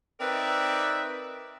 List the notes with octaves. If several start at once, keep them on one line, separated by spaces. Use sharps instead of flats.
C4 D#4 A#4 B4 D5 E5